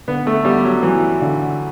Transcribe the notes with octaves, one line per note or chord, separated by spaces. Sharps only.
D3 B3
A3
G3 B3
F#3
E3 F#3
D3